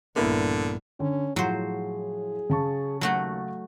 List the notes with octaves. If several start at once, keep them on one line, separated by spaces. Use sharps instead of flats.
A#1 G2 D3 A#3 B3 E4
D3 C#4
A2 F3 F#3 G#4 C5
C#3 A5 C#6
D#2 F#3 A3 F#4